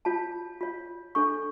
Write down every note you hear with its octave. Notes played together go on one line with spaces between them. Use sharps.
F4 C#5 A5
F4 C#5
D4 A4 C#5 C#6